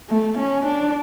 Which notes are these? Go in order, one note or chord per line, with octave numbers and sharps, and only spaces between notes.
A3
C#4
D4